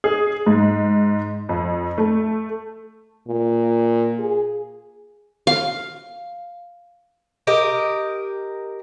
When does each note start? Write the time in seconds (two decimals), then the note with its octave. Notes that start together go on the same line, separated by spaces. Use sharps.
0.04 G#4
0.46 G#2
1.49 F2
1.98 A3
3.28 A#2
4.19 G#4
5.47 F5
7.47 G4 A#4 D#5